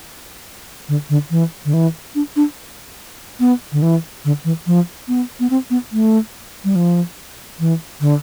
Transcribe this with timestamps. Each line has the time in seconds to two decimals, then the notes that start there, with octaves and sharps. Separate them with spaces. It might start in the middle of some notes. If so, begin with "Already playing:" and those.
0.89 D3
1.10 D3
1.31 E3
1.65 D3
1.74 E3
2.15 D4
2.36 D4
3.40 B3
3.72 D3
3.82 E3
4.25 D3
4.45 E3
4.67 F3
5.08 B3
5.40 B3
5.50 C4
5.70 B3
5.92 A3
6.64 G3
6.76 F3
7.60 E3
8.01 D3